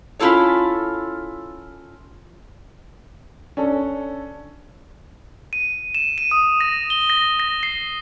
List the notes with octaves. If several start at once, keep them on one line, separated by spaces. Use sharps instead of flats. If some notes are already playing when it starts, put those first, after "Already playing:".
C#4 E4 F4 A4 C#5
C#4 D4 A4
D#7
E7
D#7
D#6
A#6
G7
A#6
A#6
C7